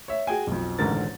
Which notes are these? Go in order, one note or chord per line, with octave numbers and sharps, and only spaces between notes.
C#5 E5
F#4 G#4 G5 G#5
B1 F2
D#1 A1 G#2 D3 A#4 A6